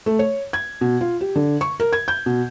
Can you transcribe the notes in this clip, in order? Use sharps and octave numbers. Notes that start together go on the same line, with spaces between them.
A3
C#5
G#6
B2
F4
G4
D3
C#6
A#4
G#6
G6
B2